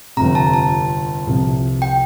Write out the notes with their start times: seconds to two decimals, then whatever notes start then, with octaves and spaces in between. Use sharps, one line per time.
0.17 G1 F2 C3 A#5
0.35 A5
0.54 A5
1.27 C2 C3 F3
1.82 G5